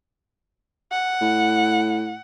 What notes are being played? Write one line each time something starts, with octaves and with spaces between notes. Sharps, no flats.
F#5
A2